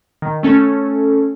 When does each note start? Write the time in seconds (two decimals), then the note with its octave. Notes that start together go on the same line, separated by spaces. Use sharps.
0.22 D#3
0.43 A3 C#4 A4